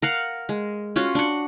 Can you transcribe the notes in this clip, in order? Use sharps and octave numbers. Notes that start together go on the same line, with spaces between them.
A#4 F5 F#5
G#3
C#4 F4 F#4
D4 F#5